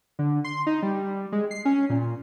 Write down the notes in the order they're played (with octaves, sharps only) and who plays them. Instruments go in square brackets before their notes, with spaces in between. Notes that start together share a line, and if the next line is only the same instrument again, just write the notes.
[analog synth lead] D3
C6
D#4
G3
G#3
C7
C#4
A#2